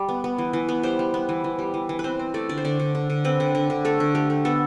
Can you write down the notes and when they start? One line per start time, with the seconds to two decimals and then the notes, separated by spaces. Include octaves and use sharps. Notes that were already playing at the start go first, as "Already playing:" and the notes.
Already playing: G3 D5
0.09 B3
0.24 B3
0.38 E3
0.53 E3
0.69 B3
0.83 G3 C5
0.99 G3
1.14 B3
1.29 E3
1.44 E3
1.59 G3
1.74 E3
1.89 E3
1.99 B4
2.04 C4 C5
2.19 C4
2.34 A3 D5
2.49 D3 D5
2.57 C5
2.65 D3 D5
2.80 D3
2.95 D3
3.10 D3
3.25 C4 B4
3.40 D3
3.55 D3
3.70 D3
3.85 A3 A4
4.00 D3
4.15 A3 G4
4.30 A3
4.45 B3 A4